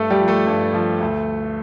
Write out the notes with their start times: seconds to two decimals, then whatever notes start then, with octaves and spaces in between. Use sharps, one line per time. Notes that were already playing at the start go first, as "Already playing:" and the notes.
Already playing: G2 A3 A4
0.10 G3 G4
0.20 F3
0.28 A3 A4
0.47 G2
0.74 F3
1.01 D2